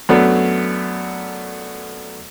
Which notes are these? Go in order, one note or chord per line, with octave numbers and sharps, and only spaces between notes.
F#2 F#3 A3 B3 D4